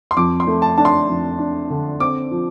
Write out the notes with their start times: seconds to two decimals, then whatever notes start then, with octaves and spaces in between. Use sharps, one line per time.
0.11 C6
0.17 F2 D6
0.40 C6
0.47 A3
0.62 A5
0.78 D4 A5
0.85 C6
1.09 F2
1.39 D4
1.70 D3
2.00 C4 D6
2.31 F3